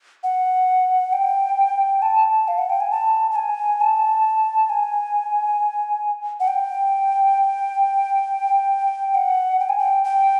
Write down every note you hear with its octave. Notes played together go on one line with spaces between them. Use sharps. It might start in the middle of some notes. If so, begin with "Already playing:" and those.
F#5
G5
A5
F5
F#5
G5
G#5
A5
A5
G#5
A5
G#5
F#5
G5
F#5
G5
G#5
G5
G5